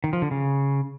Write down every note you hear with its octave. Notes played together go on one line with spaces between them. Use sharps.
D#3
F3
D3
C#3